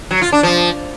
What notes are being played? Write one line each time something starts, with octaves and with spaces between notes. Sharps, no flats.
F#3
F4
D4
F3